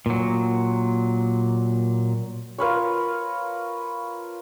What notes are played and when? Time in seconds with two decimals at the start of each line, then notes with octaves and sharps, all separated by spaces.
0.06 A#2 F#3
2.58 F4 A#4 B4 C#5